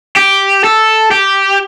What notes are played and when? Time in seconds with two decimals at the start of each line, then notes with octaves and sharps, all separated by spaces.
0.17 G4
0.64 A4
1.11 G4